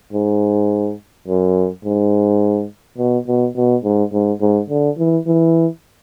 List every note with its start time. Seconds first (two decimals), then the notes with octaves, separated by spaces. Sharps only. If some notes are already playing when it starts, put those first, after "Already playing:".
0.13 G#2
1.28 F#2
1.85 G#2
2.98 B2
3.27 B2
3.56 B2
3.84 G#2
4.13 G#2
4.41 G#2
4.70 D3
4.98 E3
5.26 E3